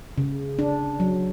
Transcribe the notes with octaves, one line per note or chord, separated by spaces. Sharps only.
C#3
D4
F#3